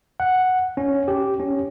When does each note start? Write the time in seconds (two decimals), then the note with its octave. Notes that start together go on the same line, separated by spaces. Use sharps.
0.20 F#5
0.77 C#4
1.08 G4
1.39 C#4